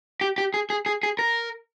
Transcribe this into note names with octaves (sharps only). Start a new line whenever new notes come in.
G4
G4
G#4
G#4
G#4
G#4
A#4